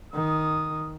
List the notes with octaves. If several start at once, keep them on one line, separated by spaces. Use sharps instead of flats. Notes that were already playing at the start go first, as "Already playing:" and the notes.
D#3 D#6